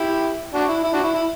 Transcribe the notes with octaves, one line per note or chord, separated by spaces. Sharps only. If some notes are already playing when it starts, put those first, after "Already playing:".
Already playing: E4 G4
D4 F#4
E4
E4
D4 F#4
E4
E4